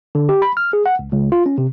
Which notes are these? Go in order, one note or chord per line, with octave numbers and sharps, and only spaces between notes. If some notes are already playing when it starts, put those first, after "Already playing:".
D3
G4
B5
F6
G#4
F#5
C#2
C#2
F4
C#4
C3